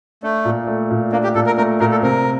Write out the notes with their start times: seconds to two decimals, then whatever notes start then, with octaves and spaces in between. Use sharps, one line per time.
0.23 A3 D4
0.45 A#2
0.67 A3
0.91 A#2
1.12 A#3 D4
1.23 G4
1.35 A#2 A4
1.46 A#4
1.57 A3 A#4
1.80 A#2 A#4
1.91 A4
2.02 C3 A#4